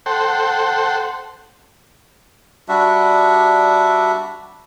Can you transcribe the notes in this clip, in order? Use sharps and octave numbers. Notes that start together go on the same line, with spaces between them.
A4 C5 F#5 G5
G3 D4 F#4 E5